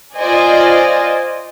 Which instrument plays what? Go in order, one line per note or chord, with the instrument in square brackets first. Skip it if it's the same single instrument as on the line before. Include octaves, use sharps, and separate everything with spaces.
[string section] F4 C5 D5 D#5 G#5